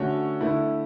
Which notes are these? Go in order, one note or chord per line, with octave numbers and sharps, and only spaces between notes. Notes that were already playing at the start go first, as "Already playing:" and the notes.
Already playing: D3 A3 C#4 F#4 C#5
D3 A3 E4